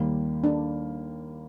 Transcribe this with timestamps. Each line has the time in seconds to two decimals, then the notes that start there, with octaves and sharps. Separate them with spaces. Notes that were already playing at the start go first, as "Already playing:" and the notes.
Already playing: D#2 D#3 G3 A#3
0.44 D4